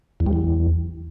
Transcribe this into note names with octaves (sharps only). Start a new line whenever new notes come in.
E2
G3
E2